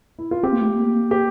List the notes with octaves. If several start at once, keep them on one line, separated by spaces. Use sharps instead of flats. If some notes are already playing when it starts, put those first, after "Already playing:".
E4
F4
C4 G4
A#3
A3
A#3
G4